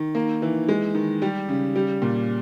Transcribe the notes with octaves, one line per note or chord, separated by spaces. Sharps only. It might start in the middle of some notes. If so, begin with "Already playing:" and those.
Already playing: D#3
A#3
E3
G#3
D#3
G3 G4
C#3
G3
A#2